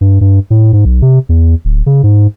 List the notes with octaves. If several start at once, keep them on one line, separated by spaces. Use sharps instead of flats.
G2
G2
A2
G#2
B1
C3
E2
D1
C#3
G#2